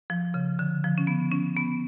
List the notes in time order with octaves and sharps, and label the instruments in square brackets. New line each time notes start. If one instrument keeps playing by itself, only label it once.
[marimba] F3
C#3
D3
F3
C#4
B3
C#4
B3